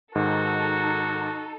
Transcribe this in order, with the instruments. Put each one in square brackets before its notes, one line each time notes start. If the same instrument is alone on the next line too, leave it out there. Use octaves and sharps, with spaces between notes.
[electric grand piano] G#2 D#3 [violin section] D#4 A4 [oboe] F#4